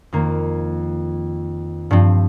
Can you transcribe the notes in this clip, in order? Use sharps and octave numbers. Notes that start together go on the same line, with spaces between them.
F2 D#3 A#3
G2 F3 C4